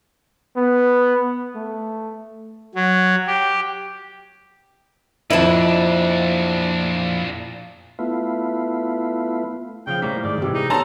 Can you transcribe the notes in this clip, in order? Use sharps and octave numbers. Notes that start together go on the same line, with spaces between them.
B3
A3
F#3
G4
F2 A#2 D4 E4 C5 D#5 A5
A3 B3 E4 F4
C#3 F3 F5 G5
A2 G3 A#3 C5 C#5 B6
G#2 D#3 G3 D5
C3 E3 G#3 G4
D#4
B3 A4 C#5 A5 A#5 C6